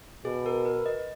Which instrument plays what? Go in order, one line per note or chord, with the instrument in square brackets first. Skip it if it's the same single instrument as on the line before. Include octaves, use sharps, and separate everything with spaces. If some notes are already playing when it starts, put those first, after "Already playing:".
[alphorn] B2 [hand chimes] G#4
[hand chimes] A#4
B4
D#5